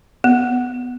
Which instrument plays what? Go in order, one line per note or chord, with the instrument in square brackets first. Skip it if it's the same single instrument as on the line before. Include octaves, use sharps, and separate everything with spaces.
[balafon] B3